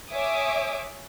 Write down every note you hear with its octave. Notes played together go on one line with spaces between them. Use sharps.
C#5 E5 G#5 D6 D#6